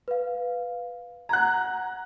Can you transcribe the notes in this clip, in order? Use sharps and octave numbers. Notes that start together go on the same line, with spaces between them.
B4 F5
F#5 A#5 F#6 G#6